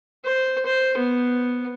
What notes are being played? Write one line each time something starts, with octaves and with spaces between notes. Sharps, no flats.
C5
C5
B3